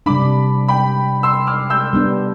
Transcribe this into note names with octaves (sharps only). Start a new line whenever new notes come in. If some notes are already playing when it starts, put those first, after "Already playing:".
C3 G3 D4 B5 D6
G5 B5
C6 E6
D6 F6
E6 G6
G3 B3 D4